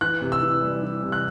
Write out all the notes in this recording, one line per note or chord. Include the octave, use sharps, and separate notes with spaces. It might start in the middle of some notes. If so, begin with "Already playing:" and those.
E3 F#6
C3
E6
E3
G3
E3
C3
F#6